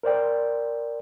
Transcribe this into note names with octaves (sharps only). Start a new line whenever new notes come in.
A#4 C5 D5 G5